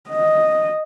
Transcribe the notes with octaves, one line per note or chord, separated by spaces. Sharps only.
D#5